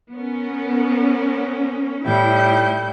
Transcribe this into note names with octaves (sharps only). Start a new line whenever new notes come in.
B3 C#4 A#4
A2 G3 E4 G6